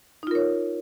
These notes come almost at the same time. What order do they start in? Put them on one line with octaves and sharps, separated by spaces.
D#4 F4 A#4 C#5